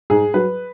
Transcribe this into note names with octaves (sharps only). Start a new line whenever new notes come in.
G#2 G#4
F#3 B4